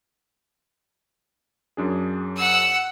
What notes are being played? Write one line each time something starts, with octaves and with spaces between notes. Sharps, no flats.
F#2 D4 G#4
F#5 E6